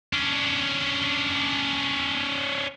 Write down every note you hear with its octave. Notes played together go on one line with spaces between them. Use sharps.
C#4 D4